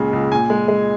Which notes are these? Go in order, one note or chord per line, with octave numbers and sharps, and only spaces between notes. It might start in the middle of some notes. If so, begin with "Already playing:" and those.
Already playing: C#2 A#2 C#3 G#3
C#2
A#2 G#5
G#3
G#3